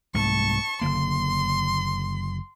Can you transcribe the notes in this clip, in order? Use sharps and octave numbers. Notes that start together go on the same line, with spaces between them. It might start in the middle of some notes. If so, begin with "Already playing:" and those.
C2 G#2 A3 A5 C#6
F#1 D3 A#3 C6